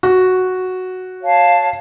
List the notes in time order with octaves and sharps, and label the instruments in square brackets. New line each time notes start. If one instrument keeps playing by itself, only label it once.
[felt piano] F#4
[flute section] C#5 F5 A5